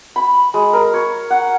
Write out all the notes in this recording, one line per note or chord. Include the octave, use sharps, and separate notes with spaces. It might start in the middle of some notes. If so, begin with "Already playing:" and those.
B5
G#3
A#4
C#5
F#5